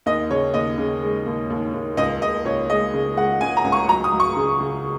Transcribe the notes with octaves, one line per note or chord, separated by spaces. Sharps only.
D#2 D#5
C#3 C#5
D#2 D#5
C#3
G#3
D#2
D#2
D#2
C#2 D#5
C#2 D#5
C#2 C#5
G#3 D#5
C#3
G#3 F#5
C#2 G#5
A#5
C#2
C#6
F#3 A#5
D#6
F#3
C#6
C#3
C#3